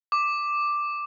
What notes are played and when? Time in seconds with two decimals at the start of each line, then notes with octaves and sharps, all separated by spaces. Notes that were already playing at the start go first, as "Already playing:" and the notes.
0.12 D6